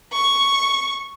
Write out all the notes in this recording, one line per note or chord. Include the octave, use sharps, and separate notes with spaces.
C#6